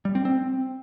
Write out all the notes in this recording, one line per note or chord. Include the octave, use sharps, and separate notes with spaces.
G3
C4
C4